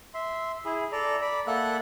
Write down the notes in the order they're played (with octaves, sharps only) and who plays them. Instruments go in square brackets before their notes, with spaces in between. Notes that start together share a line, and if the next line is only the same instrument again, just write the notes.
[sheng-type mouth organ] E5 C6
E4 G#4
A4 D5 A#5
D5 B5
A#3 A4 E5 F#5 F#6